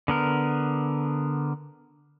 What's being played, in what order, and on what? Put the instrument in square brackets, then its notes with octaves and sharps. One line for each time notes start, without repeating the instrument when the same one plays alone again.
[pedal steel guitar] D3 B3 A#4